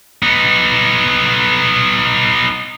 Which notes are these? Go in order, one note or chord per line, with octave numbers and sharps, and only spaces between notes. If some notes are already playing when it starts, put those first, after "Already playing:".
B3 D#4